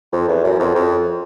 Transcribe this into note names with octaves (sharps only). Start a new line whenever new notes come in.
F2
E2
F#2
F2
F2